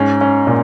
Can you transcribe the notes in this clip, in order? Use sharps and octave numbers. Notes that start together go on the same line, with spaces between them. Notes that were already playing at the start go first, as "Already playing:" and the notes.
Already playing: G#2 C#4
C#4
A#2